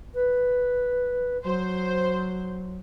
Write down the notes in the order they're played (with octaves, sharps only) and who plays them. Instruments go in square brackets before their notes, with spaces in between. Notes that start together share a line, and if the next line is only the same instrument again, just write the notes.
[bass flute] B4
[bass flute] F#3 [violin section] C5